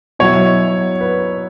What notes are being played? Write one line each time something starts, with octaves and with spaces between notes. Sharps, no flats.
B2 F#3 E4 C#5
B4